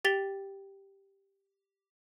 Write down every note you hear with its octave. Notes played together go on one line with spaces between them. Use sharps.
G4 G5 A6 B6 F7 G7